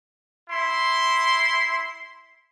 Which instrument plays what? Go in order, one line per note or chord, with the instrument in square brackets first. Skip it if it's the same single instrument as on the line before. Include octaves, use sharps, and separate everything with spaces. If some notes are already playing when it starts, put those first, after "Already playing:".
[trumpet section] E4 C6